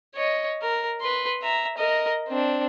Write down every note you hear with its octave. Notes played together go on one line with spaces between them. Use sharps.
C#5 D#5
A#4
B4 C6
E5 A#5
A#4 D#5
C4 D4